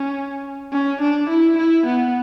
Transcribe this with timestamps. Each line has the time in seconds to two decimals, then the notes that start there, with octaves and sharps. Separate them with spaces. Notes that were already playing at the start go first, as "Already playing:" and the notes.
Already playing: C#4
0.72 C#4
1.01 D4
1.29 E4
1.58 E4
1.86 B3